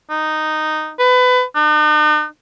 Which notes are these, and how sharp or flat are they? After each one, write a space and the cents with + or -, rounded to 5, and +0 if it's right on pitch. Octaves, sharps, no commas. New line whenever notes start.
D#4 -10
B4 +25
D#4 -45